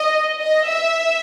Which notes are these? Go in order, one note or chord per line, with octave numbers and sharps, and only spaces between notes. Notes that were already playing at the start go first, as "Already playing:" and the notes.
Already playing: D#5
D#5
E5